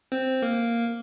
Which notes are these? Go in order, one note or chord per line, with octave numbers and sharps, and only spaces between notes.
C4
A#3